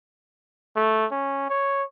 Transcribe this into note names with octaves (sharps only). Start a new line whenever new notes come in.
A3
C#4
C#5